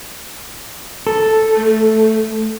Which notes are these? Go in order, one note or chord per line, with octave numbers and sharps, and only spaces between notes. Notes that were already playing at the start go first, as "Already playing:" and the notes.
A4
A3